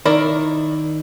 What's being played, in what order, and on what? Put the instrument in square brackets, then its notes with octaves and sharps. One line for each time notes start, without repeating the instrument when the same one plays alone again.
[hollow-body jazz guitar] D#3 [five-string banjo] E4 A#4 D5